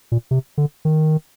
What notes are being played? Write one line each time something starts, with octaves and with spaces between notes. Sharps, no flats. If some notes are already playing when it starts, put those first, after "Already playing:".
A#2
C3
D3
D#3